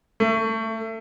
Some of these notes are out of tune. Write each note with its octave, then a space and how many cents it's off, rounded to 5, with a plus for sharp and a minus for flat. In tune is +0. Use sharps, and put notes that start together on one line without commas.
A3 +25